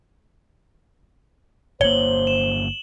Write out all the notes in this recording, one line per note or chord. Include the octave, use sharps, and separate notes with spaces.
G1 A#3 C5 C#5 F#7 G7
E7